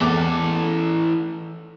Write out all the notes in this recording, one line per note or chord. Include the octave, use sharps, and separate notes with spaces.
E2 E3 A4 D6